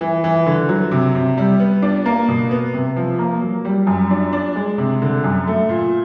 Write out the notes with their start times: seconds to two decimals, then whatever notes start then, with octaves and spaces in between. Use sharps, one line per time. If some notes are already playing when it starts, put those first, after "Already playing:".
0.01 E3
0.24 E3
0.46 D3
0.69 F#3
0.91 C3
1.15 C3
1.37 G3
1.60 B3
1.82 D4
2.06 A#3
2.28 B2
2.51 B3
2.73 C3
2.96 F3
3.19 A#3
3.41 F#3
3.65 G3
3.87 F#2
4.11 D4
4.33 D4
4.56 G#3
4.78 C3
5.02 D3
5.24 F#2
5.47 A3
5.69 A#2